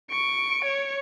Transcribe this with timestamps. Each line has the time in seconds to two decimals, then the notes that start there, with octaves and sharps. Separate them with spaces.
0.10 C#6 D7
0.65 C#5